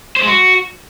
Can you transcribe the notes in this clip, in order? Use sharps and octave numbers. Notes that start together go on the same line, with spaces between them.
C5
G#3
F#4